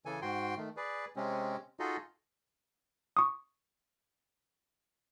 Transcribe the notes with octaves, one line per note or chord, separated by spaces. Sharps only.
C#3 E3 A4 G#5
G#2 F#4 G5 C6
D#3 A3
G#4 B4 D5
C3 G#3 C4 C#4
D#4 F4 F#4 G#4 A4 D#5
C#6 D#6